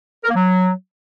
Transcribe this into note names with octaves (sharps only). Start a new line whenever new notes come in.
A#4
A#3
F#3